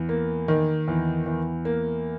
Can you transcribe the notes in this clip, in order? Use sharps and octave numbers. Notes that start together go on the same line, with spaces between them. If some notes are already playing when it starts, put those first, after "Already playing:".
Already playing: E2
A#3
D#3
E2
E2
A#3